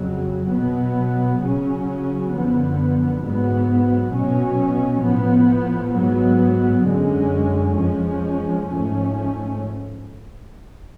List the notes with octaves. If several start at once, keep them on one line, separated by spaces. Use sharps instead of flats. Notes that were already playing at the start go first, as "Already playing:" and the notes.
Already playing: F2 C#3 F#3
B2 F#3 B3
C#3 F#3 C#4
F#2 D3 F3 B3
G#2 F#3 B3
B2 F#3 C#4
A2 F3 B3
G#2 F#3 B3
F#2 D3 G#3 C#4
F2 F3 G#3 C#4
G#2 F3 A3 C#4